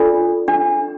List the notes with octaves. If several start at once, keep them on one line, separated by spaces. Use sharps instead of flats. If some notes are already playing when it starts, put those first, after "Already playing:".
Already playing: D4 F4 A4 D5
D4